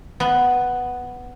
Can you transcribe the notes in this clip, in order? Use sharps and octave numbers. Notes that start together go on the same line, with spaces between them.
B3